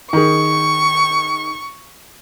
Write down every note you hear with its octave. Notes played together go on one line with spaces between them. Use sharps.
D#3 G#4 C#6